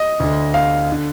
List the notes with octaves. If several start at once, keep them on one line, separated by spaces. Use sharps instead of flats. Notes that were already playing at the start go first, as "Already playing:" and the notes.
Already playing: D#5
D2 D3
F5
D3